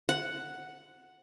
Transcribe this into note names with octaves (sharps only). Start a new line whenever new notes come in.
F#5